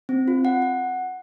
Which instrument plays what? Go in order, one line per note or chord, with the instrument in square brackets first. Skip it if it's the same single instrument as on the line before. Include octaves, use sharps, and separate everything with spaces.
[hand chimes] C4
F4
F#5
F#5